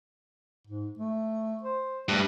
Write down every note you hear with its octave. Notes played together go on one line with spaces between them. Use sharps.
G#2
A3
C5
G2 A3